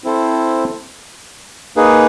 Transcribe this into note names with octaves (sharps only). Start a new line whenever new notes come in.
C4 E4 A4 C5
A#3 D#4 G#4 B4